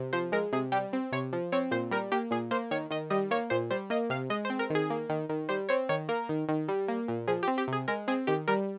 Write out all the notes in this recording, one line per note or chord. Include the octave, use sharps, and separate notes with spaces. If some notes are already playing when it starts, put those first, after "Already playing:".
Already playing: C3
F3 C5
G#3 A#4
C3 G#4
G3 G4
C4
C3 C#5
F3
C4 C#5
A#2 C5
G3 A#4
A#3 G4
A#2 G#4
A#3 C5
D#3 C#5
D#3 D#5
G3 D#5
A#3 C#5
A#2 C5
G3 C5
A#3 D#5
C3 F5
G#3 D#5
C5
C4
A#4
D#3 G#4
A#3
D#3
D#3
G3 C5
C4 C#5
D#3 C#5
A#3 A#4
D#3
D#3
G3
A#3
A#2
F3 G#4
G4
C4
G4
C3 G#4
G#3 A#4
C4 G#4
D#3 G4
G3 A#4